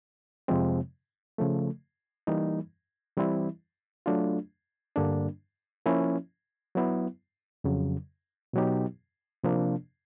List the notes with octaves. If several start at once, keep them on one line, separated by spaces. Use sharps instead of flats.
F2 C3 F3 G#3 C4
C#3 F3 A3
E3 G3 A#3 D#4
E3 G3 C4 E4
F#3 A3 D4 F4
G2 D3 G3 A#3 D4
F3 A#3 C#4 E4
F#3 B3 E4
F2 C#3 F#3
B2 F#3 B3 D#4 G4
C3 F3 A#3 D4